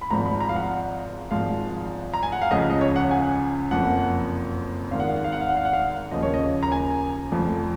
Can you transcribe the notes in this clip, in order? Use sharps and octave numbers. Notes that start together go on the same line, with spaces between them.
B5
G#1 G#2 F3 A#5
B5
A#5
F5
F#5
G#1 G#2 F3 F5
A#5
G#5
F#5
F5
C#2 C#3 F3 D#5
D#5
C#5
F#5
G#5
F#1 F2 F3 F#5
G#1 G#2 D#3 F5
F#5
F5
F#5
F5
F#5
F5
F#5
F5
F#5
F5
D#2 C#3 F3 D#5
C#5
D#5
A#5
G#5
F1 F2 F3